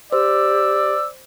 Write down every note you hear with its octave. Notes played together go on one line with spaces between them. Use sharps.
G4 C5 D5 E6